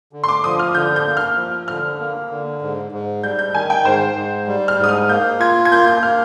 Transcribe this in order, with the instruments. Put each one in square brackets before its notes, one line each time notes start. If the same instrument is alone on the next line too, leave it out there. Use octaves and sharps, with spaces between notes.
[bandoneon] D3
[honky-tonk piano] C6
D6
[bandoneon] F3 [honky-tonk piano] D#6
[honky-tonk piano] F6
[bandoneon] D3 [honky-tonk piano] G6
[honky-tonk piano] G6
[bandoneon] A#3
[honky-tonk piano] F6
[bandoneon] F3
[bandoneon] D3 [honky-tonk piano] F6
[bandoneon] A#3
D3
G#2
G#2
[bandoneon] G3 [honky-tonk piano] G6
[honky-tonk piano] G6
[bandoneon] D#3 [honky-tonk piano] G#5
[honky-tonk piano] G5
[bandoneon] G#2 [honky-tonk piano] C5
[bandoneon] G#2
G3
[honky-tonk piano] F6
[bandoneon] G#2
[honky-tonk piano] D#6
F6
[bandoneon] A#3 [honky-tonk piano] G6
[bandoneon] F4 [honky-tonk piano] G#6
[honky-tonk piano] G#6
[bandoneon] A#3 [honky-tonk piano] G6
[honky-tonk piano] G6
[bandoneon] A#3 [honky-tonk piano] F6